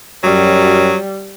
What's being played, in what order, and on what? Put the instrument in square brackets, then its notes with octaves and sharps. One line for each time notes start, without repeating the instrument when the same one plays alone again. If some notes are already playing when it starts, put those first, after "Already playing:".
[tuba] F#2 [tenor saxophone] F#3 [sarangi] G3